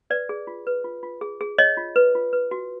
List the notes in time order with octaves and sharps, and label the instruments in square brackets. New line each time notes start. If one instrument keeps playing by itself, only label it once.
[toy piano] B4 D5
G#4
F4
B4
F4
F4
G#4
G#4
G#4 C#5 D#5
F4
B4
F4
B4
F#4